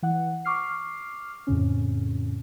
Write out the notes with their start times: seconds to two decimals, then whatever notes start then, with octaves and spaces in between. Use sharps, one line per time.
0.03 E3 F#5
0.45 C#6 D6 F6 C7
1.47 F2 A2 C#3 C#4